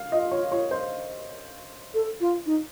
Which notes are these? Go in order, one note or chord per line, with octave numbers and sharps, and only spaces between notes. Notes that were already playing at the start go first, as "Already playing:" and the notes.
Already playing: F5
F4 D#5
C#5
C#5
C5
A4
F4
D#4